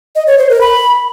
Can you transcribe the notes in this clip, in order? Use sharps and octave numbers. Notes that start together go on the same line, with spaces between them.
D#5
C#5
C5
A#4
B5